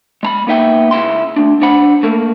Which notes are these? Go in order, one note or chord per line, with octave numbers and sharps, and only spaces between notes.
G#3 A#5 B5
A#3 B3 D#4 E5 G5
C#2 C#3 E4 C6
A3 D4
D4 C5 F#5 B5
A3 A#3